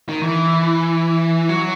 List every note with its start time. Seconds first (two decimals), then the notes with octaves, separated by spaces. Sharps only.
0.09 D#3
0.23 E3
1.49 F#3